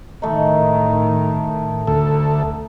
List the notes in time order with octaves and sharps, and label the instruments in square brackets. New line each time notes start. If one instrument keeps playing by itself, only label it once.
[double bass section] A2 D#3 [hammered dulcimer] A3 D#4
[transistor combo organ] D2 A4